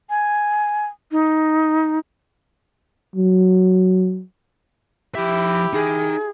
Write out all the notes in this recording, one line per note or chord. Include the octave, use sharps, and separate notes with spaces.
G#5
D#4
F#3
F3 E4 G4 E5
D#4 G#4 G5